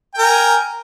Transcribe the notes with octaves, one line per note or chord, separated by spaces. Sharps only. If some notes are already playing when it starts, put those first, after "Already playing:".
A#4 G5 G#5